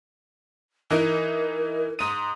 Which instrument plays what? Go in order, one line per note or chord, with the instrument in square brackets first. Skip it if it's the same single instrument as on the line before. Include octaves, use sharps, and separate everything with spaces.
[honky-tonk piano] E3 D#4 [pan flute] A#4
[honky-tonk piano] G#2 D#7 [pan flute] D#6